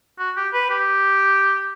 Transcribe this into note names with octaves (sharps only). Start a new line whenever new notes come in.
F#4
G4
B4
G4